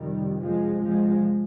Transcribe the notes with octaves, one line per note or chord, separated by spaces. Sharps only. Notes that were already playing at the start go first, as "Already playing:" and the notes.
Already playing: F2 C3 D#3 G3
F3 G#3
F3 G#3